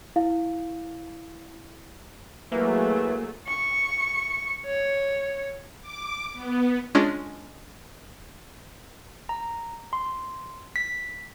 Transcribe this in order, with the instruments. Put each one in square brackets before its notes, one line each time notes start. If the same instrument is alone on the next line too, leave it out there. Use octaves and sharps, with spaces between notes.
[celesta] E4 F5
[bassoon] E3 [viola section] F#3 A3 G#4 [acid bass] A#3
[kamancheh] C#6
C#5
[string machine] D6
B3
[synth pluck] G#3 C#4 D4 F4 G#4
[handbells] A#5
C6
B6